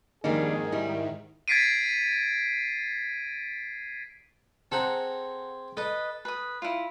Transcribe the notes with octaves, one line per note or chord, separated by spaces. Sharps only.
F2 G#2 D#3 G3 A#3 D4 D#4 G#4
G3 D#4 E4
G#6 A6 B6 C7 D7 D#7
C4 G#4 A4 C5 F#5 A#5
A4 B4 D#5
B4 D#6
E4 F4